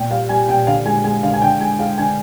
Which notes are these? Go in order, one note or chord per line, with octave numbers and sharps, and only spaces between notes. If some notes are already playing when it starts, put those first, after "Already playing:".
Already playing: A#2 G5
G3 F5
G3 G#5
A#2 G5
D3 F5
G#3 G#5
G#3 G#5
D3 F5
G#5
D3 G5
G#3 G#5
G#3 F5
D3 G#5